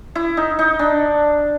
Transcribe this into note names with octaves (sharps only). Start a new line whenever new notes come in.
E4
D#4
D#4
D4